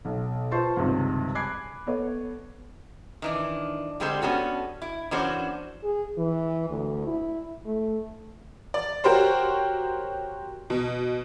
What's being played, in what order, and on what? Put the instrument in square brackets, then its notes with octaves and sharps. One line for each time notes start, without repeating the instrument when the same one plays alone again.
[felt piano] B1
F4 B4 C5 A5 C6 C#6
C#2 G2 C3 D#3
G#5 B5 D6 F#6 G#6 C7
B3 A4 C#5
[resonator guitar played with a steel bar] D#3 E3 D4
D3 G3 G#3 C4 A4 C5
B3 C#4 F#4 A4
E4
E3 A#3 C#4 D4 F#4 C5
[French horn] G#4
E3
D2
E4
A3
[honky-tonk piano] D5
F#4 G4 A#4 C5 C#5
B2